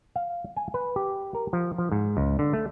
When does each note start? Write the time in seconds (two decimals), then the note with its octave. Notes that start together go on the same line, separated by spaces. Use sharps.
0.16 F5
0.56 G#5
0.74 B4
0.96 G4
1.35 A#4
1.53 F3
1.78 F3
1.92 G#2
2.17 C#2
2.39 D3
2.53 A3